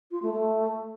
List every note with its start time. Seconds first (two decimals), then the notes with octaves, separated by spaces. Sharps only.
0.11 F4
0.22 A3
0.33 A3